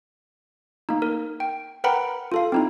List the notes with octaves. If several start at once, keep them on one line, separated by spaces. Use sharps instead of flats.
A#3 D#4
A#4
G5
A#4 B4 F#5 G5 A#5 B5
F4 A4 F5
C4 D#4 E4